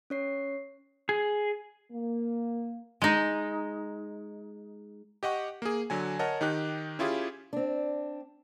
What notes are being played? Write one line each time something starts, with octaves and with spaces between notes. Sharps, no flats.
C#4 C#5 C7
G#4
A#3
G#3 D#4
G4 D#5 F#5 C#6
A#3 G#4
D3 F#3 G#5
A#4 C#5 D#5 F#5 A5
D#3 D#4 G4 F#6
C#4 E4 F4 G4 G#4
C4 D4